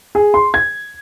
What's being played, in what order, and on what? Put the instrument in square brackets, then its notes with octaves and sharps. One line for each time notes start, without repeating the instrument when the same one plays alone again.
[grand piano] G#4
C6
G#6